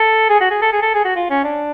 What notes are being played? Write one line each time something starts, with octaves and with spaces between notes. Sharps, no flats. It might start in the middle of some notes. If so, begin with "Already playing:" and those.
Already playing: A4
G#4
F#4
G#4
A4
G#4
A4
G#4
F#4
F4
C#4
D4